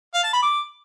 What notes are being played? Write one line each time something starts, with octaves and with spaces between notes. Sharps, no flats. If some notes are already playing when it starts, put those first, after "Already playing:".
F5
A5
B5
D6